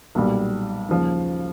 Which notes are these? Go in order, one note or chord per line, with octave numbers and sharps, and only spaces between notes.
B1 A#2 G3
D#2 C#3 F3